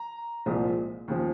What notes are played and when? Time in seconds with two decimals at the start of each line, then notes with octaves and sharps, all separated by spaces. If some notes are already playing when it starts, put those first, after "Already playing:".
Already playing: A#5
0.46 C2 A#2 F3 G#3
1.08 D#2 C#3 F3